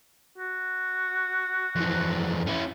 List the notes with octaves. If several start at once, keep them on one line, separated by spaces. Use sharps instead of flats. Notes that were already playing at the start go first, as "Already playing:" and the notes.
F#4
F2 E3
C#4 E4